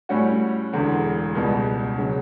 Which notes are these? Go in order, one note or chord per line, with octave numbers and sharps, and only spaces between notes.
A2 G3 C#4 F#4
E1 E2 D3
C#2 B2 G3
C#3 F#3